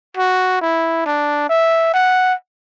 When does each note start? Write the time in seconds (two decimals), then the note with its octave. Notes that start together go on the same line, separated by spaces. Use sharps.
0.17 F#4
0.61 E4
1.06 D4
1.50 E5
1.94 F#5